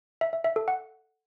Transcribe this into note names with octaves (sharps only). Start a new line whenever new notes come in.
E5
E5
E5
A4
F#5